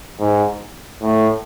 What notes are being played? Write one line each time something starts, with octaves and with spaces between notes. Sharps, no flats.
G#2
A2